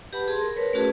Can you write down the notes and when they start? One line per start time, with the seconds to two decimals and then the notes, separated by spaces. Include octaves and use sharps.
0.13 G4 B4 F#5 A5 B5
0.28 G#4 A5 C6
0.41 A#4
0.56 A#4 B4 C#5
0.73 A3 C#4 F#4 G#4 B4 A5